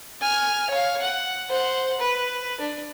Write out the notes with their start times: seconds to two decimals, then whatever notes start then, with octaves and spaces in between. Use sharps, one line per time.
0.21 G#5 F6
0.70 C#5 F5
1.02 F#5
1.49 C5 F#5
2.00 B4
2.60 D4